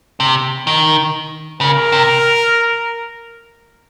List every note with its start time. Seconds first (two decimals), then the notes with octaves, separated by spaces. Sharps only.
0.20 C3
0.67 D#3
1.61 C#3 A#4
1.92 C3